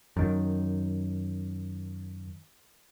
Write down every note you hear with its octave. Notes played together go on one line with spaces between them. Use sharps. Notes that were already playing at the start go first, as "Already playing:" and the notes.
F#2 D#3